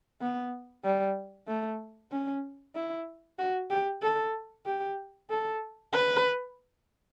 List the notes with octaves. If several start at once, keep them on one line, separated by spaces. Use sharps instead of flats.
B3
G3
A3
C#4
E4
F#4
G4
A4
G4
A4
B4